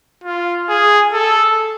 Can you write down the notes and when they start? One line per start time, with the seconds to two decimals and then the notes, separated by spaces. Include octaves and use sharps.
0.24 F4
0.69 G#4
1.13 A4